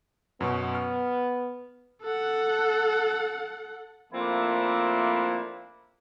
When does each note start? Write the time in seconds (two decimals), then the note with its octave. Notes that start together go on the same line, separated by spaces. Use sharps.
0.41 F#2 B2 B3 C#6
0.75 F6
2.02 A4 F#5
4.12 F3 A3 A#3 C4 D4 E4